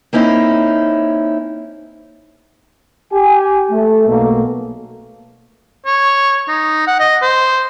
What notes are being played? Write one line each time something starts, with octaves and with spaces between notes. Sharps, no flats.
A#3 C4 C#4 D#4 E4
G4 G#5
A3
B1 B2 A3 A#3
C#5
D#4
F#5
D#5
C5